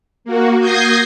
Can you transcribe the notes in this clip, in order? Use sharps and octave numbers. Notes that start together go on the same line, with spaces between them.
A#3 F#4
D#6 G6 G#6 A#6 C7